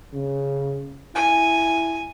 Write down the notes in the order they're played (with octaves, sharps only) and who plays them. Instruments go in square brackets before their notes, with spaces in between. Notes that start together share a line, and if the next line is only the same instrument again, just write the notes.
[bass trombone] C#3
[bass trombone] E4 [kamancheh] G#5